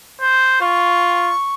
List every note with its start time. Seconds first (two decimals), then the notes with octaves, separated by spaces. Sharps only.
0.21 C5
0.61 F4 C#6